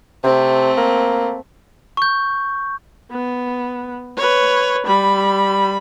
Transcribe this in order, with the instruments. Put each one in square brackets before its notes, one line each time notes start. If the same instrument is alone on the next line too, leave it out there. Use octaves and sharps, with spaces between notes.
[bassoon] C3 [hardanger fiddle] A3 C4
[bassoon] A#3
[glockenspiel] C#6 G6
[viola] B3
B4 C#5
G3 B5